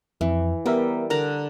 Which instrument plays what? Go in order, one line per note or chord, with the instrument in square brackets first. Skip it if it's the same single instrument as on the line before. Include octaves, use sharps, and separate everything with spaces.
[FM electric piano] F2 [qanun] E3
[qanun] G3 G5 [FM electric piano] B3 A#4 E5
[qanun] D3 D5 A#5 [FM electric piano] A#4